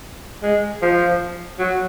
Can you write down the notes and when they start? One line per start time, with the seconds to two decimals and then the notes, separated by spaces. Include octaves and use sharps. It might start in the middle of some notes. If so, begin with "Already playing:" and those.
0.43 G#3
0.82 F3
1.59 F#3